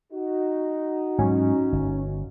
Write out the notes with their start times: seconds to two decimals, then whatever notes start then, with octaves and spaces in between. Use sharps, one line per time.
0.13 D#4 F#4
1.18 G#2 F#3 G3 C#4
1.72 G1